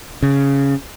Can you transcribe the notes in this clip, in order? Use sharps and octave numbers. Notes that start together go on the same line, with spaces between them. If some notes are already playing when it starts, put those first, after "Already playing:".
C#3